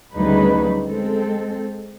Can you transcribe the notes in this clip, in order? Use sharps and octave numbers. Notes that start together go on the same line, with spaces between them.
D2 C#3 F#3 G3 D#4 B4
G#3 C4 A4